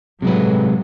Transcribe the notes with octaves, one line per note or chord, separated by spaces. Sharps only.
A2 C3 F#3 G#3 B4